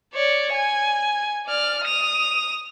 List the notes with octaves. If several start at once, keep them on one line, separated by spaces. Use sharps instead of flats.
C#5 D5
G#5
D5 F6
D#6 F7